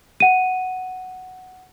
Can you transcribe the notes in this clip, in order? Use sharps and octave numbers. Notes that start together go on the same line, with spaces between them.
F#5 D#7